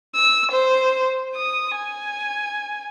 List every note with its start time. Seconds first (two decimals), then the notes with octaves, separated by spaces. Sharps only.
0.15 E6
0.51 C5
1.36 D#6
1.77 G#5